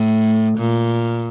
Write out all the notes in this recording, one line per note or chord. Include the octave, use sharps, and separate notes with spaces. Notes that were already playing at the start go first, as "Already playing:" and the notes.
Already playing: A2
A#2